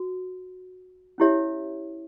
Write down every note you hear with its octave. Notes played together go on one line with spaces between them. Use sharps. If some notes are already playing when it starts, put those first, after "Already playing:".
Already playing: F#4
C#4 E4 G4 C#5 E5